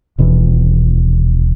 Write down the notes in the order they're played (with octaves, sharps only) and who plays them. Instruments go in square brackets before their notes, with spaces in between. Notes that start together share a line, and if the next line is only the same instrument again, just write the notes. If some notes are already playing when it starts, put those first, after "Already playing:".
[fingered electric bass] D#1 B2 E3